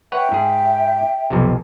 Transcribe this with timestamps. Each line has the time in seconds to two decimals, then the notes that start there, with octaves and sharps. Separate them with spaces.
0.12 B4 C#5 E5 F#5 G5
0.32 G#2 G#4
1.30 B1 F2 C3